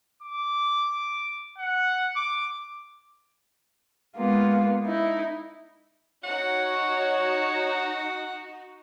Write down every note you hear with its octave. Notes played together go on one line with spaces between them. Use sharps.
D6
F#5
D6
G#3 A#3 B3 F4
D#4 E4
D#4 F#4 C#5 F#5